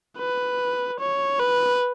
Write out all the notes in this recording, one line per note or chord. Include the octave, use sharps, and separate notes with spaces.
B4
C#5
B4